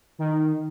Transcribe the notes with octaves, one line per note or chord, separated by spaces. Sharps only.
D#3